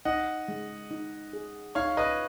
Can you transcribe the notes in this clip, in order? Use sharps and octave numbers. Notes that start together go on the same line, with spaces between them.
D#4 D#5 F#5
G#3
D#4
G#4
D#4 C#5 F5
B4 D#5